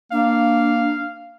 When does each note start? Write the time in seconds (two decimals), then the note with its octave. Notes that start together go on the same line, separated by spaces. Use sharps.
0.12 A#3 D4 F5